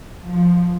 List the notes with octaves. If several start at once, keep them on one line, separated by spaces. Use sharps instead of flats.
F3